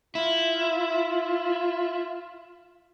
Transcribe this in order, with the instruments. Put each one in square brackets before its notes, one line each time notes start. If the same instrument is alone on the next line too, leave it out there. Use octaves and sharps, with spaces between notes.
[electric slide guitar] E4 [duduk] F4